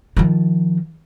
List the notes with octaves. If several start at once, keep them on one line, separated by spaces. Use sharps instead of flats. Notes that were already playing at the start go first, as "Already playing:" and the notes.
D#3 F3